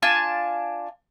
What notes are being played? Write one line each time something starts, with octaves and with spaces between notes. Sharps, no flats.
D4 F4 G#5 A5